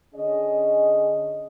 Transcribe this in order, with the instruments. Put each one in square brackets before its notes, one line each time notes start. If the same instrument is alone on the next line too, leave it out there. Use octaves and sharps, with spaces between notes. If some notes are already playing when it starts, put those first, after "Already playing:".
[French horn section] D3 C#4 G#4 D#5